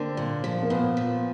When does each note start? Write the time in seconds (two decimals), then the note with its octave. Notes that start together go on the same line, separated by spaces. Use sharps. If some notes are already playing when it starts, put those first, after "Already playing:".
Already playing: D3 A#3 C4
0.17 A#2
0.44 F3
0.63 A#3
0.70 A#2 B3
0.97 F3